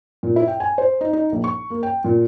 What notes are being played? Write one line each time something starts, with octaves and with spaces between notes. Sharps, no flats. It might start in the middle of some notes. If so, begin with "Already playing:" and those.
A#2
E4
G5
G#5
C5
D#4
D#4
A#1
C#6
A#3
G5
A#2